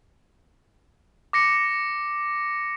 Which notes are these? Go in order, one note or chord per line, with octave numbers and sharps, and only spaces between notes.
D6 A#6 C#7